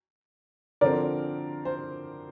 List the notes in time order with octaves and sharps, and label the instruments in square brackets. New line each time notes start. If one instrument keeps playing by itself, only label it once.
[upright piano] D3 F3 C4 A#4 D5
C5